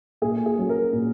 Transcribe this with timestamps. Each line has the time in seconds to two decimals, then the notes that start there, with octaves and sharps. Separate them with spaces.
0.22 A#2 G#4
0.46 G#4
0.57 F#3 C#4
0.69 A#4
0.93 A#2